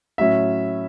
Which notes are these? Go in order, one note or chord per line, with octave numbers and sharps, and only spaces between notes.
A2 F#3 C#4 E5